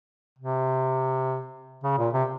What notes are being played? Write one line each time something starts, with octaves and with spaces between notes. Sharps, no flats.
C3
C#3
A#2
C3